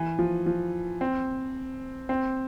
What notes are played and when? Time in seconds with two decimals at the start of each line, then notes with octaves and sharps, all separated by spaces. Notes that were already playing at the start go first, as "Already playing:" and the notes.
Already playing: E3
0.19 F3
0.46 F3
1.01 C4
2.09 C4